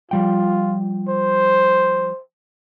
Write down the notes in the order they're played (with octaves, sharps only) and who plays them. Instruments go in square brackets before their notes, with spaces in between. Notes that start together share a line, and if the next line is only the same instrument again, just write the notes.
[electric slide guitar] F3 G3 G5 [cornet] F4
[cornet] C5